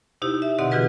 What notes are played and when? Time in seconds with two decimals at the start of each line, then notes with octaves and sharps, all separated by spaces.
0.22 C3 D#4 E4 G4
0.42 E5
0.59 B2 D3 C4 G4 D#5 F#5
0.71 E3 F4 F#4 G#4 B4 D#5